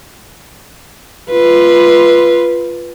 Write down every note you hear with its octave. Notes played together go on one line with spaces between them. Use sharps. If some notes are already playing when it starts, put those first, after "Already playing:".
F4 B4